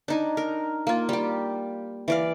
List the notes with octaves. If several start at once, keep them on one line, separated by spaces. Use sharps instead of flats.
D4 D#4 G#5
A#4
A#3 F4
G3 G4
E3 D5 F5